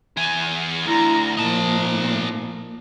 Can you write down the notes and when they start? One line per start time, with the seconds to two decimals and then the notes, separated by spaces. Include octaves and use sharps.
0.17 E3 G#4
0.87 D2 E4 A#5
1.37 A#2 F3 D#4 A5